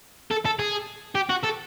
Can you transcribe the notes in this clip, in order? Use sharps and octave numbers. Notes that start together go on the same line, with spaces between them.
A4
A4
G#4
G4
F#4
A4